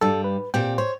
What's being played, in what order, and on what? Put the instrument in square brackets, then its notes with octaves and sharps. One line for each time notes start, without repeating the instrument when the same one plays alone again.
[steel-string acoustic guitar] G2 G3 [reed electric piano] A4
[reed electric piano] B4
[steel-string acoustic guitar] A#2 C4 G4 [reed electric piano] G5
[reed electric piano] C5 [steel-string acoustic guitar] C#5